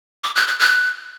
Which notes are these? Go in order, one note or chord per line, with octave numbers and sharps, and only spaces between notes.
D6
F#6
F#6
F#6